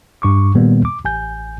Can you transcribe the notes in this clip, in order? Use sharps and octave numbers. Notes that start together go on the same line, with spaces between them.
G2 C#6 D6
A#2 D#3 G3 A#3 B3
D6
A1 G#5 G6